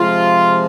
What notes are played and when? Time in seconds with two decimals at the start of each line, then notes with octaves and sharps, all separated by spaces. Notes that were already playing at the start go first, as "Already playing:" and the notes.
Already playing: C3 F3 G#3 F4